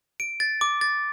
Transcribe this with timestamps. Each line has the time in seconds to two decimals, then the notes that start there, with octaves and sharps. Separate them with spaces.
0.20 D7
0.40 A6
0.61 D6
0.81 A6